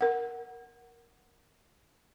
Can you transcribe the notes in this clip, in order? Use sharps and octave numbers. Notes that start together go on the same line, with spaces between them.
A#4 F#5